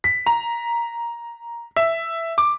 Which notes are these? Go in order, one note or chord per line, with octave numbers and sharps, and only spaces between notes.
B6
A#5
E5
D6